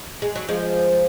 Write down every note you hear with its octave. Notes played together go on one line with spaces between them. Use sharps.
G#3
F#3
F3 G#3